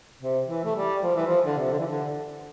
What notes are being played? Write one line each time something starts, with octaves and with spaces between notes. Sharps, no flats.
C3
E3
A3
G3
F3
E3
F3
D3
C3
D3
E3
D3